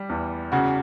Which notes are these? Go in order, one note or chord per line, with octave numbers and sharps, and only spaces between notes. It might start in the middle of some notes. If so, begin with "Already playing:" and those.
Already playing: G3
E2
C#3 F#4